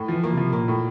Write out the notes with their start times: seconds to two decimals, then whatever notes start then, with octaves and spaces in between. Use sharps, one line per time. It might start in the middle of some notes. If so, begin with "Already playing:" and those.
Already playing: A2
0.08 E3 F3
0.23 A#3
0.33 C3 F3
0.53 A#2 A#3
0.68 A2